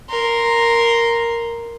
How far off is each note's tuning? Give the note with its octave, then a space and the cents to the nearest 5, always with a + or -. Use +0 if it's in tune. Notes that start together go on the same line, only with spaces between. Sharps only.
A#4 +0 C6 +0